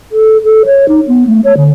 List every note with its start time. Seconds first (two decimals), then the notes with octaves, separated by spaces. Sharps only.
0.12 A4
0.44 A4
0.66 C#5
0.88 D#4
1.08 B3
1.27 A3
1.44 C#5
1.57 D3